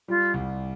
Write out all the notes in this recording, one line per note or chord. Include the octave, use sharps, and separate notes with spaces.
G3 F4
C2